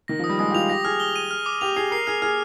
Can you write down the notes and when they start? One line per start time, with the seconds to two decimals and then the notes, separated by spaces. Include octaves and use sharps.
0.08 D#3 A#6
0.19 F3 D#6
0.29 G3
0.39 G#3 D#6
0.50 G4
0.54 F4 F7
0.69 G4 A#6
0.84 G#4 F6
1.00 G7
1.16 D#7
1.31 F6
1.46 D6
1.61 G4 F7
1.76 G#4 C7
1.91 A#4 C7
2.07 G#4 F6
2.22 G#4 F6